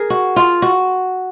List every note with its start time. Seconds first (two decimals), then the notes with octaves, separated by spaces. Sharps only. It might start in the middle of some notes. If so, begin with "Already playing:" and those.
Already playing: G#4 A#4
0.10 F#4
0.36 F4
0.62 F#4